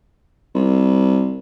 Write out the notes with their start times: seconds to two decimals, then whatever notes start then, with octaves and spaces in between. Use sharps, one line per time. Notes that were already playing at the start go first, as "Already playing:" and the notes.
0.55 C2